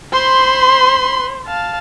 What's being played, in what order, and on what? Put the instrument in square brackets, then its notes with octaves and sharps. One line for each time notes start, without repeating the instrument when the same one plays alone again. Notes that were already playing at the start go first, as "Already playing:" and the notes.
[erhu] C5 [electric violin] B5 C6
[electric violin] F5 A5